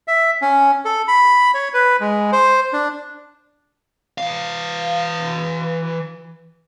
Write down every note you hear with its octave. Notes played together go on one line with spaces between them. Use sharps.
E5
C#4
A4
B5
C#5
B4
G#3
C5
D4
E3 F5